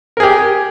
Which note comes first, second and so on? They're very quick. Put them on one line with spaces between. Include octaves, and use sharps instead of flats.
A#4 G#4 G4